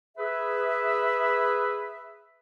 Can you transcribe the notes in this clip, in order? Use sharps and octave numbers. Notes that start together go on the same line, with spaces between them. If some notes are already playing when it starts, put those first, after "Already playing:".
G#4 B4 E5